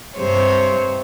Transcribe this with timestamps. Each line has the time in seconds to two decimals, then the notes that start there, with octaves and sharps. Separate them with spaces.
0.17 G2 C3 C5 C#5